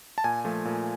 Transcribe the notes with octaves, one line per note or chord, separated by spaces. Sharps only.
A5
A#2 G#5
F3 A3
A#2